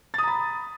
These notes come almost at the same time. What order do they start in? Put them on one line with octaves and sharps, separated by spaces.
A6 D#6 A#5 B5